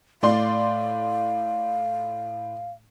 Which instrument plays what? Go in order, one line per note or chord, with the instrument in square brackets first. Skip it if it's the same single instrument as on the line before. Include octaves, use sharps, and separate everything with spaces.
[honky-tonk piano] A2 D5 C6 [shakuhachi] F5